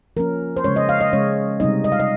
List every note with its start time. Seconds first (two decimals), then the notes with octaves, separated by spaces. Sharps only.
0.17 F3 A#3 C#4 A#4
0.57 C5
0.64 C#3 G#3 C#4 C#5
0.76 D#5
0.89 F5
1.01 D#5
1.13 C#3 G#3 C#4 C#5
1.60 C3 G3 C4 D#4 D#5
1.84 D#5
1.92 F5
2.00 D#5